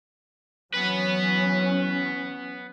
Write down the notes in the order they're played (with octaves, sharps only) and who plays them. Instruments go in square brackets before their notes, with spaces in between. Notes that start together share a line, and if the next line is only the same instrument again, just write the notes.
[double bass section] E3 F#3 C#4 [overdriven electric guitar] B3 B4